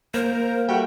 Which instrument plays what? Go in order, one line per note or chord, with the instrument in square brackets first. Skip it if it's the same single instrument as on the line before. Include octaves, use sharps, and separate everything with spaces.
[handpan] A#3 [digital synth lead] A#4 [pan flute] C5
[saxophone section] G3 A3 F#4 [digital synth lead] G5